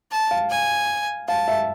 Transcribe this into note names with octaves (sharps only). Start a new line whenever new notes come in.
A5
F5
G#5
F5 A5
E5